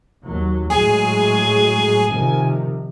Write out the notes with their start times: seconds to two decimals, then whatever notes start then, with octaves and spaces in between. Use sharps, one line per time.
0.23 D#2 F#3
0.70 A2 F#3 G#3 G#4 G#5
2.09 C3 D#3 F3